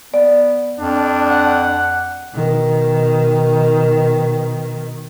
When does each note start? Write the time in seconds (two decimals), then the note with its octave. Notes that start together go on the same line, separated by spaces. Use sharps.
0.14 B3 D5
0.79 F2 D4
1.30 F#5
2.34 B2 D#3